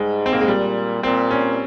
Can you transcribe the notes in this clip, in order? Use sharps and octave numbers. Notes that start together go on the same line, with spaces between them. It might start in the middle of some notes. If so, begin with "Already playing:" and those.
Already playing: G#2 G3 G#3
C4
A#3
G#3
A#2 G3
A#2 C4
C#4